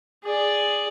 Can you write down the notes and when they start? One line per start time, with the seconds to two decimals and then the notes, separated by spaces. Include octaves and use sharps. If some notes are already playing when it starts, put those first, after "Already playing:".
0.24 G#4 D5